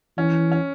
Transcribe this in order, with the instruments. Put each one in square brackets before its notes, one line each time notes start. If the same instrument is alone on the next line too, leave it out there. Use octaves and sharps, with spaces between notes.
[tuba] E3 [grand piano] C#4
[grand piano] C#4